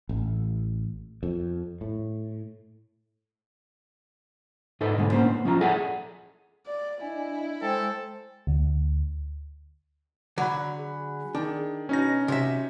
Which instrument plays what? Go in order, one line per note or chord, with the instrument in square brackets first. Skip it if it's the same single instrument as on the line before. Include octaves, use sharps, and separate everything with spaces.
[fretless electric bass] A1
F2
A2
[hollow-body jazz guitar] G#2 D#4 A4 B4 D5 D#5
B1 G#2 D3 G#3 B3
A2 A#3 B3 C#4 C5
B3
F3 C#4 F4 D#5 A#5
G#4 A4 D5 E5 F#5 G#5
[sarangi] D5
[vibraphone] D4 G#5 [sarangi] E4 [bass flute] D#5
[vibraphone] G#3 G5 G#5 [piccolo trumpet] A4 [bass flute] C5
[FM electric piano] D2
[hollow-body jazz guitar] D3 F#3 [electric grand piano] F#5 B5
[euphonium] G#4
[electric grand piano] D#3 [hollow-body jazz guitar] D4
[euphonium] B2 [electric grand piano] C#4 D#4 A#6
[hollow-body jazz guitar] C3 E5 [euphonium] F#3